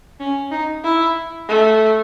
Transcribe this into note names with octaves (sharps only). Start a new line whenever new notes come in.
C#4
D#4
E4
A3